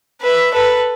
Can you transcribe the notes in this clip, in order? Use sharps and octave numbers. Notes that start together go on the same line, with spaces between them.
B4 E5
A4 B4